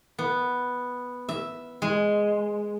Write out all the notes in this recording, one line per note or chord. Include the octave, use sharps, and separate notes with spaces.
B3
E5
G#3